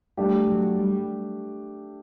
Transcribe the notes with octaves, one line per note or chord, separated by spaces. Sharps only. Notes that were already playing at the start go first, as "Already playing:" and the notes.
G3 A3 D4 G4
F#3
G3